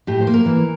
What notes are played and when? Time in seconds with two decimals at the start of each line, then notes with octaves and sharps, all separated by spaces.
0.07 A2 G4
0.21 C5
0.27 A#3
0.34 A#4
0.46 E3